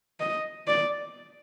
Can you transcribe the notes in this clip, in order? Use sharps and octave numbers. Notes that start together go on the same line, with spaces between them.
D#5
D5